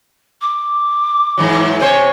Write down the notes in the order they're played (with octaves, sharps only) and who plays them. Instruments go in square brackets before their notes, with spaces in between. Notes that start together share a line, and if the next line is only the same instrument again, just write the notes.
[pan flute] D6
[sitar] G#2 E3 F#3
[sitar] C3 C5 C#5 [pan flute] G#5